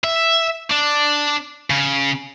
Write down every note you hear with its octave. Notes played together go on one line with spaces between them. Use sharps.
E5
D4
C#3